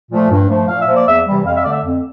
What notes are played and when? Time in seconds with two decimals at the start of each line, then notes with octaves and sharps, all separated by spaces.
0.10 A#2 F3 A3
0.30 G2
0.48 F3 A3
0.67 A#2 F5
0.81 E5
0.87 F3 A#3
0.95 D5
1.07 E2 E5
1.26 C3 E3 G3
1.45 F2 F5
1.55 E5
1.63 D3 A3 D5
1.72 E5
1.84 F2